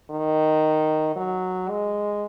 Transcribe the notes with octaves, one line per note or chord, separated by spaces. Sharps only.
D#3
F#3
G#3